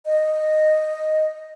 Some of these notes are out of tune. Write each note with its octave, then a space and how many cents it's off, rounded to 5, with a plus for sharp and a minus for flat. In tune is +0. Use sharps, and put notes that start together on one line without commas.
D#5 -5